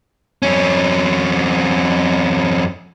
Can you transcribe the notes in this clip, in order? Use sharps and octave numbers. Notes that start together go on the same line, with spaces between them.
F2 C#4